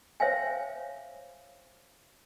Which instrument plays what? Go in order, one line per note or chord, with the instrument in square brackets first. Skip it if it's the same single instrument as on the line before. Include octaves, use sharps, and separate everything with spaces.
[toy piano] C5 C#5 E5 F5 G5 G#5